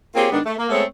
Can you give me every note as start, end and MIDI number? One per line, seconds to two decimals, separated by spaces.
0.16 0.29 58
0.16 0.29 60
0.16 0.29 65
0.16 0.29 67
0.16 0.29 68
0.16 0.29 73
0.31 0.40 44
0.31 0.40 51
0.31 0.40 59
0.31 0.40 62
0.46 0.53 57
0.58 0.70 58
0.70 0.84 56
0.70 0.84 57
0.70 0.84 59
0.70 0.84 60
0.70 0.84 69
0.70 0.84 73